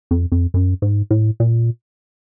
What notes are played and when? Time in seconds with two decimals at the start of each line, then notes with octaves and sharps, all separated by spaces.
0.11 F2
0.32 F2
0.54 F#2
0.82 G#2
1.11 A2
1.40 A#2